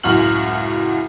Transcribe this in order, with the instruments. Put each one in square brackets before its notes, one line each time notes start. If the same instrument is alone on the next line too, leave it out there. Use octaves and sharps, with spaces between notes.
[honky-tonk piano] C#2 F#2 A2 F#4 F6 F#7